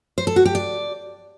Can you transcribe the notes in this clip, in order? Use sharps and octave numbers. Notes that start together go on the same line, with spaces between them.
C5
A4
F#4
G4
D5